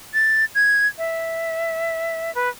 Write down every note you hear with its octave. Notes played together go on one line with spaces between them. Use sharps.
A6
G#6
E5
B4